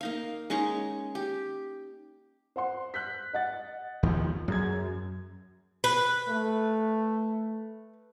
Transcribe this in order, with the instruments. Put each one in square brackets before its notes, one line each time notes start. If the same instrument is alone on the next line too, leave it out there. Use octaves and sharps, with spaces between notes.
[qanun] A#3 D#4 F5
G#3 C#4 D#4 C#6
G4
[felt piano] C5 F#5 C6
F#6 G6 B6
D#5 F#5 A6
[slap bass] D#2 F3
[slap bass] F#2 [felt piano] F#3 G#4 G#6
[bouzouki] B4
[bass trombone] A3